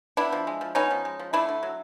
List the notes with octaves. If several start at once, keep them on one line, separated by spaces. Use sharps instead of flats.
B3 D4 E4
F3
G#3
F3
B3 C#4 D#4
F3
G#3
F3
A3 D4 E4
D3
F#3